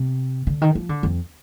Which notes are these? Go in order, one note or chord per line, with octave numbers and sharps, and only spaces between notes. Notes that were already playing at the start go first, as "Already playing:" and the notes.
Already playing: C3
D3
D#3
F3
D3
F2